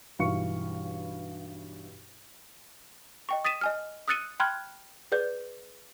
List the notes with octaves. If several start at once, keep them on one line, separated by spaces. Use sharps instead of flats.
B1 G2 E3 F5 C#6 C#7
D#5 G5 C#6
D#6 A6 B6 D#7 E7
D#5 G#5 F6
D#6 E6 F#6 A6 C#7 D#7
G5 B5 C6 F6 F#6 G#6
G#4 B4 D5 G6